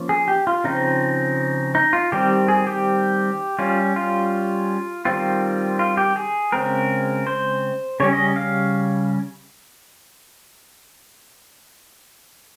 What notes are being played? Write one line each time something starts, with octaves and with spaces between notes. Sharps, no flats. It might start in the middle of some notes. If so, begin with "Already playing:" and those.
Already playing: F3 A#3 C#4
G#4
G4
F4
C#3 F3 C4 D#4
D#4
F4
D#3 G3 C4 G4
G#4
G4
G3 C#4 F4
F4
D#3 G3 C4 F4
F4
G4
G#4
C#3 G#3 C4 A#4
C5
C#3 G3 C#4 C#5
D#5
F5